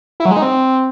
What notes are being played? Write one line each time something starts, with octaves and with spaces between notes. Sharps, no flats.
E4
F#3
G#3
D#4
C4